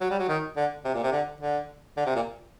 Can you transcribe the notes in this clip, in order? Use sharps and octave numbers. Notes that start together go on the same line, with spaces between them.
F#3
G3
F#3
D#3
D3
C3
A#2
C3
D3
D3
D3
C3
A#2